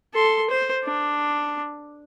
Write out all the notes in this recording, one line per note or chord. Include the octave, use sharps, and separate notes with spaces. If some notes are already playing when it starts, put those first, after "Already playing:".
A4 C6
C5
D4